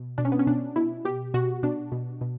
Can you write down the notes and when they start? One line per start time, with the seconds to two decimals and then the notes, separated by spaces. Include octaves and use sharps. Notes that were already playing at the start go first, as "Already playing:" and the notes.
Already playing: B2
0.18 B2 D4
0.25 C#4
0.32 B3
0.39 C#4
0.47 B2 D4
0.76 B2 E4
1.05 B2 G4
1.34 B2 F#4
1.63 B2 D4
1.92 B2
2.21 B2